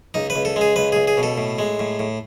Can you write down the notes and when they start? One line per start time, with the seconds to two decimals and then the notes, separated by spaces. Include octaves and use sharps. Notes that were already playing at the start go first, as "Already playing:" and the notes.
0.14 C#2 D#4
0.30 B4
0.36 C#2
0.45 A4
0.56 G#3
0.61 G#4
0.76 C#2 B4
0.92 C#2 G#4
1.07 G#4
1.17 B2
1.23 A4
1.38 A2
1.59 G#3
1.79 A2
1.99 A2